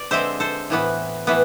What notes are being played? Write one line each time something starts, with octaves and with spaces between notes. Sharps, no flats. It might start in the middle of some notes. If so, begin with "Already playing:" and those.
Already playing: D5
D3 G#3 C4 C5 E5
A4 C5
A2 E3 B3
A2 E3 B3